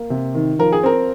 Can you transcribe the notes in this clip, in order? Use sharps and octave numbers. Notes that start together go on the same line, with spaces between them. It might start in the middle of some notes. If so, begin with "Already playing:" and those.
Already playing: A#3
C3
D#3
F3 A#4
G#4
C4 A#4